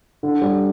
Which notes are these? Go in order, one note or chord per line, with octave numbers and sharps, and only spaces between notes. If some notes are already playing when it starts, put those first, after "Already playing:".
D3
G3